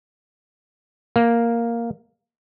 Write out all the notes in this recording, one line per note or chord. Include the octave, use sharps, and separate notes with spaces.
A#3